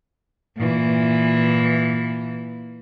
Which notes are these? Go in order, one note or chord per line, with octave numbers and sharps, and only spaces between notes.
A#2 E3